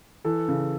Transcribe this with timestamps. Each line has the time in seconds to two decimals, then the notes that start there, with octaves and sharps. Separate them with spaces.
0.25 E3 A4
0.48 C#3